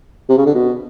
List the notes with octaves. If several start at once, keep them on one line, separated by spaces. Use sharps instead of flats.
C3
C#3
D3
B2